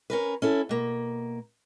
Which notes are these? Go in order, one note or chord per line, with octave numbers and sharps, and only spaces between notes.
C#4 A#4 B4
C#4 E4 A4
B2 A#3